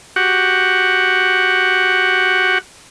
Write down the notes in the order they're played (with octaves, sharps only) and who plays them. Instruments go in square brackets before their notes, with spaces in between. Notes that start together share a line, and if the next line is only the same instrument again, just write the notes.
[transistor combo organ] F#4 G4 F#5